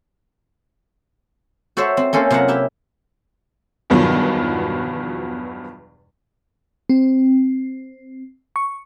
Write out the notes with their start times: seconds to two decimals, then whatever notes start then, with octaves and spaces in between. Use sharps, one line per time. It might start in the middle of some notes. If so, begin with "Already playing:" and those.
1.77 F#4 A4 C5 C#5 E5
1.97 C4
2.13 A#3 C#4 A4 C5
2.30 C3 F#3 F4 E5 F#5 A#5
2.48 E4 G4 E5
3.90 E2 G2 B2 D#3 F3 F#3
6.90 C4
8.56 C#6